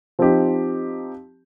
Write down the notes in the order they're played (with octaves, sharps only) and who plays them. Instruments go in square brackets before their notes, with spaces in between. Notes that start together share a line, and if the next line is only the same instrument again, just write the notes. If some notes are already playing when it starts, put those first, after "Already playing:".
[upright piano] F3 C4 D#4 G4